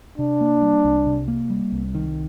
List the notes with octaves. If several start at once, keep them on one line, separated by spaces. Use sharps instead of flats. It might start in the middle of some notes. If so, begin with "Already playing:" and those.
C3 D4
A#3
G3
C2
C3
A#3
G3
C2
D#3